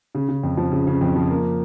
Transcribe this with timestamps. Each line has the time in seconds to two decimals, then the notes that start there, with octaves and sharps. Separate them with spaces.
0.15 C#3
0.28 C#3
0.43 F2
0.57 F3
0.72 C#3
0.87 C#3
1.01 F2
1.16 F3
1.30 A#3